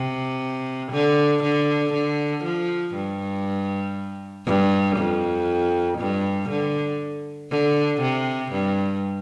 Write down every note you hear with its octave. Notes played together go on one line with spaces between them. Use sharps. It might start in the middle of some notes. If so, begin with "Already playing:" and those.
Already playing: C3
D3
D3
D3
F3
G2
G2
F2
G2
D3
D3
C3
G2